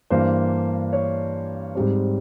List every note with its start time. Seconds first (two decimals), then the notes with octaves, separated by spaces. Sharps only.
0.10 G2 E3 A#3 C5
0.93 C#5
1.75 G#2 G3 C4